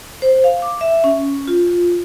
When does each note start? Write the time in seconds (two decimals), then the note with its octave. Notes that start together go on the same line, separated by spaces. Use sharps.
0.22 C5
0.44 F5
0.62 D6
0.81 E5
1.04 C#4
1.48 F4